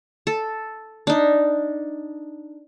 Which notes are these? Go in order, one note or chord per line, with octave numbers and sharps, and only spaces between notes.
A4
D4 D#4